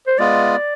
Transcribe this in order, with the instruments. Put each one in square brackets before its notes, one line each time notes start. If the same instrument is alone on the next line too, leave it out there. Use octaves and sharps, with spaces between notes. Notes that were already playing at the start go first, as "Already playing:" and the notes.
[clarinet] C5
[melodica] G#3 B3 F4 [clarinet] D5